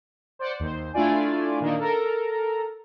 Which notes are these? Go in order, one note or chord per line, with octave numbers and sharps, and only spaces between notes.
C5 D5 F#5
D#2 C5
A3 D4 E4 F4 D5 G#5
A#2 D#3 A#3 D4 D#4
A4 A#4 A#5